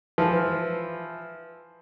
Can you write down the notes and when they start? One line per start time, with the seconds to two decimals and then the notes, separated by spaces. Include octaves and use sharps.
0.18 E3 F3